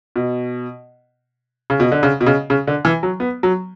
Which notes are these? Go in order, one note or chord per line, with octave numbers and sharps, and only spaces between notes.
B2
C#3
B2
D3
C#3
B2
C#3
C#3
D3
E3
F#3
B3
F#3